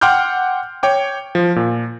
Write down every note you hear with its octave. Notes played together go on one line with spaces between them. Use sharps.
F#5 G5 C6 D6 F6 G6
C#5 G5 D6
F3
A#2